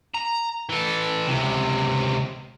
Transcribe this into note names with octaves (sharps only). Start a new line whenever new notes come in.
A#5
E3 A4
C#2 C3